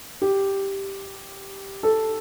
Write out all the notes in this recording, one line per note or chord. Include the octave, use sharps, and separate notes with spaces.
G4
A4